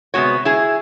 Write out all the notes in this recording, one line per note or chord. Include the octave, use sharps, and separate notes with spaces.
C3 G#3 B3 F#4 C#5
E4 G#4